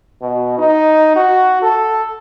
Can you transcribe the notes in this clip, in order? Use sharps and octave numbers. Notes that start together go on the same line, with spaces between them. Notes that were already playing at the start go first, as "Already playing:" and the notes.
B2
D#4
F#4
A4